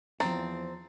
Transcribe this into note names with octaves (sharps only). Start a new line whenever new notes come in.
E2 F3 C4 A#5 A6